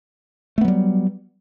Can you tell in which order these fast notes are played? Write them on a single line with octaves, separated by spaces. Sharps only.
A3 B3 F#3 G3